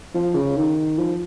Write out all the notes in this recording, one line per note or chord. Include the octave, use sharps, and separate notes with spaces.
F3
C#3
D#3
F3